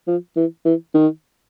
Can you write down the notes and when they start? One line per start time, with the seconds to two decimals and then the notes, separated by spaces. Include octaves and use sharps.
0.07 F3
0.36 E3
0.65 E3
0.94 D#3